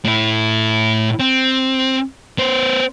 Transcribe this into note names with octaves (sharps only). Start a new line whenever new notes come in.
A2 E4
C4
B3 C5